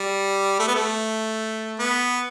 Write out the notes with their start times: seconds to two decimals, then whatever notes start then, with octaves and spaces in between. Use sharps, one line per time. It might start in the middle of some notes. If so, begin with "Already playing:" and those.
Already playing: G3
0.59 A3
0.68 B3
0.75 A3
1.79 B3